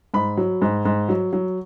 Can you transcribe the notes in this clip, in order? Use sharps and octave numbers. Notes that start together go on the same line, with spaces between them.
G#2 B5
F#3
G#2
G#2
F#3
F#3